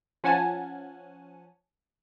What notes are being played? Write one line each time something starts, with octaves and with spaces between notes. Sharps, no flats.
F3 C#4 F#5 G#5 A5